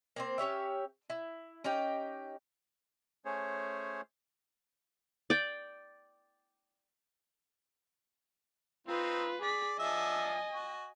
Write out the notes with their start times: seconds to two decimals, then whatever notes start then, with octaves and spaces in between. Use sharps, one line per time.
0.16 A#3 C4 C5
0.38 C#4 G4 C#5 E5
1.10 E4
1.64 C#4 D#4 G4 G5
3.25 A3 C#4 G#4 C5 C#5
5.30 D5 G5
8.87 C4 D#4 F4 B4
9.42 G#4 D5 B6
9.79 F3 D4 D#5 E5 G#5
10.52 F#4